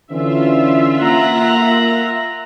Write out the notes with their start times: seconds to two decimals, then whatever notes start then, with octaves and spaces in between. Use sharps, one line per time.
0.11 D3 E3 C#4 F4 E5
1.01 A#3 F#5 A#5